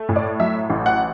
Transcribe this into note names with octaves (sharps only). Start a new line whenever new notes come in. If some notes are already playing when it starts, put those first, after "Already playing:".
Already playing: A3
A2
D5
F#3 E5
A1
F#5